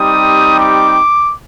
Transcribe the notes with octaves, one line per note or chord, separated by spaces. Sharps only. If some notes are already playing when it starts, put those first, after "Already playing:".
Already playing: G3 C4 D#4 G4 D#6
D6